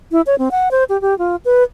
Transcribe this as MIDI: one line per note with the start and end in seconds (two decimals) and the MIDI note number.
0.12 0.21 64
0.27 0.35 73
0.38 0.49 60
0.51 0.69 78
0.71 0.84 72
0.89 1.00 67
1.01 1.17 67
1.18 1.36 65
1.45 1.63 71